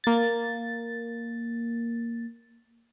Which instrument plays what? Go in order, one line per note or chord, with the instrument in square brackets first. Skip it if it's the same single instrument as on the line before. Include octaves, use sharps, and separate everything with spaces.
[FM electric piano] A#3 A6